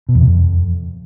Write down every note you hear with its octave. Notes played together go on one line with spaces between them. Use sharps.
B2
E2
C3
F2